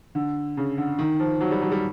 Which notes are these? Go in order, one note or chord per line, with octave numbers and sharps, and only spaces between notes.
D3
C#3
D3
D#3
F3
F#3
G3
F#3
G3